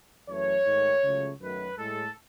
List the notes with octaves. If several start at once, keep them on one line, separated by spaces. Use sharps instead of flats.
F#2 E3 A3 C#5
G#2 D#3 A3
C#2 C#3 F#3 A3
F#2 D#3 F#3 A3 B4
A2 G#3 A4